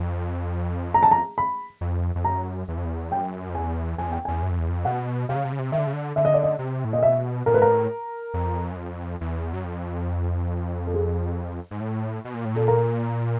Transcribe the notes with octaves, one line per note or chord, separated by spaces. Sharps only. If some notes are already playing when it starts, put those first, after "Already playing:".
Already playing: F2
A#5
A5
A#5
B5
F2
F2
F#2 A#5
E2
F2
E2
F#2 G5
F2
E2 G#5
F2 G#5
E2 G5
E2 G#5
F#2
F2
E2
F2
B2 F#5
C3 F5
C#3
C3
C#3
C3
D#3 E5
D3
C#3
D3
D3 E5
D#5
D5
D#5
C3
A2
A#2 D#5
B2 E5
A#2 A#4
A2 B4
G#2 A#4
A2
F2
F#2
F2
E2
F#2
F2
A4
G#4
G#2
A2
B2
A#2
A2
A#2 A4
A#4